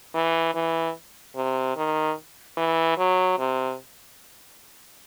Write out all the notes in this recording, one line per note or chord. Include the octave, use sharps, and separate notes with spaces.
E3
E3
C3
D#3
E3
F#3
C3